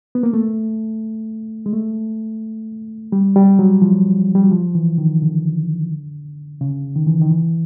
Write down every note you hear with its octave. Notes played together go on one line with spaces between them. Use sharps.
B3
A#3
A3
G#3
A3
G3
G3
F#3
F3
G3
F#3
F3
E3
D#3
D3
C#3
D#3
E3
D#3
E3